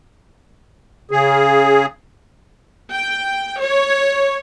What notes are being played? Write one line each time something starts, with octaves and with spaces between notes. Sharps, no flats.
C#3 G#4
G5
C#5